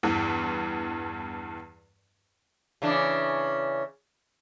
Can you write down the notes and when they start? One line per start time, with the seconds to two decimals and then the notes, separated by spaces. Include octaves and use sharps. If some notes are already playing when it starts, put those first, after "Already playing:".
0.03 E2 G2 E3
2.82 C#3 E3 D4